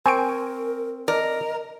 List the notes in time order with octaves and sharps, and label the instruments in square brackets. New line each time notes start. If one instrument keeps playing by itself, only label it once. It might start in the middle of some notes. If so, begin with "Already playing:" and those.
[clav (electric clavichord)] C4 [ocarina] A#4 [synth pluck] G#5 C#6 D7
[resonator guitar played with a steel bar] A#4 [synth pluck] D5 [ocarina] D#5